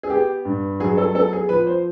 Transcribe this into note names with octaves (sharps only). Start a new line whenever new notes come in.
G#4
B3 G4
G2
F#3 G#4
A4
B3 A4
G#4
F3 B4
C5